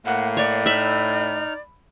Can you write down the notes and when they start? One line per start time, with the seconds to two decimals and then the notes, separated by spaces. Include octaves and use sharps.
0.06 A2 A#3 F#5
0.37 C#5 D5
0.66 D#4 E5 B5 F6